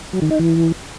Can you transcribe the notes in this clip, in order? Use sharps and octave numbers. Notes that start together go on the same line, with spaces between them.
F#3
D#3
D#4
E3